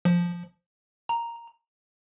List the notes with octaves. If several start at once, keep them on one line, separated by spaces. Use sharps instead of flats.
F3
A#5